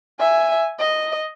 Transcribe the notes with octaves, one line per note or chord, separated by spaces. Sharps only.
E5 G#5
D#5